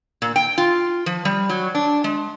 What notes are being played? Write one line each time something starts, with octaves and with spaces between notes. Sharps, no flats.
A#2
G5
F4
F3
G3
F#3
D4
G#3